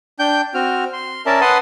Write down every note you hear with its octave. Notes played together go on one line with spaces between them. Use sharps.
D4 G5 G6
C4 F#4 F6
C6
C#4 A#4 D5 E5 A5
B4 F#5 A5 C6 D#6